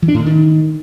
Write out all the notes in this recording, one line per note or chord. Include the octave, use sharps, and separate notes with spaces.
E3
D4
A2
D3
D#3